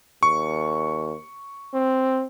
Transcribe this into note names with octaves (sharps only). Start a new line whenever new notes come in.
D#2 C#6
C4